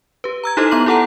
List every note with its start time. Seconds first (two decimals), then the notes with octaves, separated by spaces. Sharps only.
0.24 G4 B4
0.44 A#5 E6 G#6
0.57 D#4 E4 G4 A4 C5 D#5
0.71 B3 A#5 C6 F#7
0.86 E4 G4 A4 F#5 A5 A#5